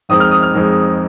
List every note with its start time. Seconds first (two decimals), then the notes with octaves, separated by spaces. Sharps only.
0.09 F2 D#3 G#3 C4 D#4 D#6
0.20 F6
0.31 D#6
0.42 F6
0.54 F2 D#3 G#3 C4 D#4